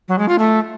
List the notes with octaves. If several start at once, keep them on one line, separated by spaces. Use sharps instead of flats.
F#3
G#3
F4
A3